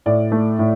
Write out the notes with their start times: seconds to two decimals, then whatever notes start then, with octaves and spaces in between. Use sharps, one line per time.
0.06 A2 D5
0.32 A3
0.59 A2